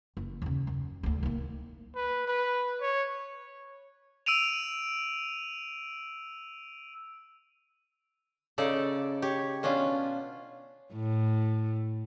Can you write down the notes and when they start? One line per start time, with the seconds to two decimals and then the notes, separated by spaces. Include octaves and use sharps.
0.17 F#1
0.42 D#2 C#3
0.67 F#2
1.03 D2 D3
1.23 D#3 A#3
1.95 B4
2.28 B4
2.80 C#5
4.26 E6 D7 D#7 F7
8.58 C#3 D#4 A4 D5
9.22 G4 C#5
9.63 B2 C#4 D4 F4
10.93 A2